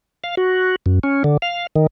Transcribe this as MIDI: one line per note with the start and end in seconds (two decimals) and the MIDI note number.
0.24 0.35 77
0.37 0.76 66
0.86 0.99 42
1.03 1.23 61
1.24 1.37 50
1.42 1.67 77
1.76 1.87 51